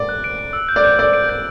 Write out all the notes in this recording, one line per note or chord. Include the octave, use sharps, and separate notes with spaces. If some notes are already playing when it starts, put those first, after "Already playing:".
Already playing: D5
F#6
D7
D7
E6
G6
D5
G6
D5 E6
D7
G6